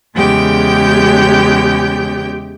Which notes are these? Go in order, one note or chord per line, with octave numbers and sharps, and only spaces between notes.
E2 C#3 G#3 G4 G5 G6